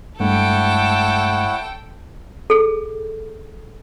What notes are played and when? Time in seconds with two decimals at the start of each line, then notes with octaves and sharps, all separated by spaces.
0.20 G2 G#3 A3 E4 A4 C#5 F#5 G5
2.50 G#4 A4